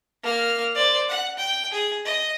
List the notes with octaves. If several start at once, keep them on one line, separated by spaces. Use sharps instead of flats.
A#3 F6
C5 D5
F#5
G5
G#4
D#5